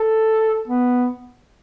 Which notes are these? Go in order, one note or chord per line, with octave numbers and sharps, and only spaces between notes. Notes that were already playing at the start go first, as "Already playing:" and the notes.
Already playing: A4
B3